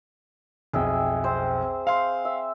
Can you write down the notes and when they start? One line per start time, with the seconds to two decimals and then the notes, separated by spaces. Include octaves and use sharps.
0.73 B1 F2 G#4 E5 G5
1.24 C4 C5
1.87 F5 C6
2.25 E5